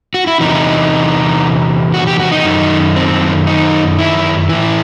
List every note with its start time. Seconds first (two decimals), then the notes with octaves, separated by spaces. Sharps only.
0.14 F#4
0.27 E4
0.41 E2 C3 E3 D#4
1.94 F#4
2.07 G4
2.20 F#4
2.32 D#4
2.45 F#2 D#3
2.96 C4
3.47 D#4
3.99 E4
4.49 A2 E3 E4